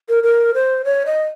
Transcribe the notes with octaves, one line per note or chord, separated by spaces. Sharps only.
A#4
A#4
C5
C#5
D#5